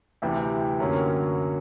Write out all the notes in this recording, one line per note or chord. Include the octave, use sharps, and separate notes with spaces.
D2 C3 E3 G3
F#2 D3 F#3 A#3 C#4